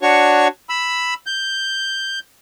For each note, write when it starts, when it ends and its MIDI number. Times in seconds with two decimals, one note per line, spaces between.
0.02 0.48 62
0.02 0.48 66
0.02 0.48 73
0.02 0.48 85
0.69 1.14 83
0.69 1.14 88
1.26 2.19 91